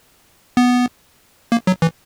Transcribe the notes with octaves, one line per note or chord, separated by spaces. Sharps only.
B3
A#3
F#3
E3